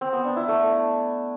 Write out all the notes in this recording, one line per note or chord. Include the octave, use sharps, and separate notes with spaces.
C4
B3
D4
E4
A3